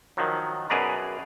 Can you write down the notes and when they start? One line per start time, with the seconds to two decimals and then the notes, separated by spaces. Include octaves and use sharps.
0.17 D#3 F3 F#3
0.70 F#2 B2 G#4 B4 D5 A#5